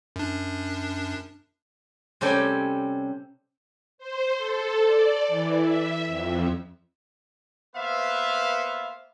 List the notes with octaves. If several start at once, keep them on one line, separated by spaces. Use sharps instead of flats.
F#2 D4
C3 G3 C#4 A4 G5 G#5
C5
A4
D5
E3
E5
F2
A#3 B3 B4 C5 E5 F5